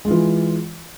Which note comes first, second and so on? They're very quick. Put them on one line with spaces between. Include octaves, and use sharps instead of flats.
G#3 F4 E3